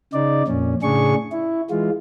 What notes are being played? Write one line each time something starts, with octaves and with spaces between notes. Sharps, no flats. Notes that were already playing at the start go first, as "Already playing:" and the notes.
C#3 D#4 D5
F2 A#2 C#4
A2 C#3 D4 G#4 C#6
E4
E3 G#3 F4